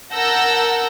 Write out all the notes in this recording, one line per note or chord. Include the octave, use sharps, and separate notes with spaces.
A#4 F#5 A5 E6 G6 A#6